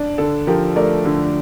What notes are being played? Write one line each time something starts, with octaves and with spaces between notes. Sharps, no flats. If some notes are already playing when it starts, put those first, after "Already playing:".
Already playing: D4
D3 A4
F3 G4 A#4
A3 A#4 D5
D3